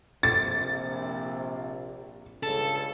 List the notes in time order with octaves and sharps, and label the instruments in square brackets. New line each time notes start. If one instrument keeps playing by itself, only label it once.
[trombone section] A#1 C3 [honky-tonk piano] A6
[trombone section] C#2 G2 C#3 [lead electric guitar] A4